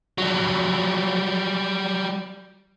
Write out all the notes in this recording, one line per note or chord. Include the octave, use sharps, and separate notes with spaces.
F#3 G3